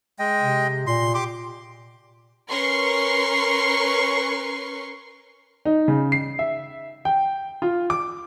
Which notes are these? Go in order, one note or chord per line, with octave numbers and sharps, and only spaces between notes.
G#3 D#5 G5
C3
A#2 C6
G4 C6 D6
C#4 A#4 B4 C6 C#6 C7
D#4
C#3
C7
E5
G5
F4
D6